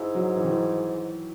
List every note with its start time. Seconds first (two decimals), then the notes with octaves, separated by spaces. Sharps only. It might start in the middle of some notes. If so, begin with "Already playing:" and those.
Already playing: G#2 E4
0.15 F#3
0.36 E3
0.44 D#3
0.51 E3